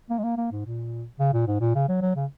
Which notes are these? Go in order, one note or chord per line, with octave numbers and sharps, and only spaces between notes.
A#3
G#3
A#3
A#3
G#2
A#2
C#3
A#2
G#2
A#2
C#3
F#3
F#3
C#3